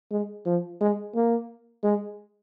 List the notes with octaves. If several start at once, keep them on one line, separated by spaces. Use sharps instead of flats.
G#3
F3
G#3
A#3
G#3